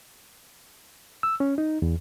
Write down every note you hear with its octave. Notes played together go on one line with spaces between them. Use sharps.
E6
C#4
D#4
E2